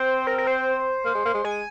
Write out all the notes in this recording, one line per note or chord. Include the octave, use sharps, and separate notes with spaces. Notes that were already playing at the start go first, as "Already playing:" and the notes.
Already playing: C4 C5
A#4
A#4
C5
A#3
G#3
A#3
G#3
G#3 G#5